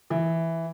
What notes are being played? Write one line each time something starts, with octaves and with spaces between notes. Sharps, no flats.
E3